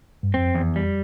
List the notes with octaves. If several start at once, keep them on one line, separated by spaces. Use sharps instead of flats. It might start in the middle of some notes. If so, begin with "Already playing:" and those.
G2
F2 C4
E2
G3